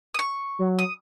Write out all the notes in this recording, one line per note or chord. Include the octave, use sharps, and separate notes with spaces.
C#6 D#6
F#3
D#6